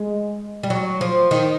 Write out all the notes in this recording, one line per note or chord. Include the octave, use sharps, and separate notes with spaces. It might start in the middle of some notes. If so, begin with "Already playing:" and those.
Already playing: G#3
G3
F#3
F3
D#3